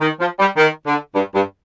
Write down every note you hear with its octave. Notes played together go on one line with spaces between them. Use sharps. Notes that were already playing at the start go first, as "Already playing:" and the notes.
D#3
F3
G3
D#3
D3
G2
G2